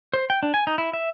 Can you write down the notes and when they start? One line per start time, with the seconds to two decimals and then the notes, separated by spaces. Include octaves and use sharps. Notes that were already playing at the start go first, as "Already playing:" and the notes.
0.14 C5
0.30 G5
0.43 D4
0.54 G#5
0.67 D#4
0.78 E4
0.93 E5